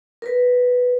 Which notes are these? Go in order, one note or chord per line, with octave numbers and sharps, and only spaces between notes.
A#4 B4